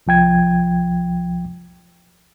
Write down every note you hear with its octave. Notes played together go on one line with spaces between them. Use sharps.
C2 F3 G5 G#6